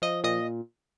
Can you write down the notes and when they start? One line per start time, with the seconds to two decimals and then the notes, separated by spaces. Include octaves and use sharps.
0.02 F3 D#5
0.24 A#2 D#5